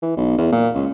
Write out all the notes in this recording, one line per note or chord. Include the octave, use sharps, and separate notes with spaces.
E3
B1
E2
A#2
C#2